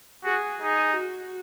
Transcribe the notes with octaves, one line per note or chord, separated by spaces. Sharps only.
F#4 G#4
D#4 G#4
F#4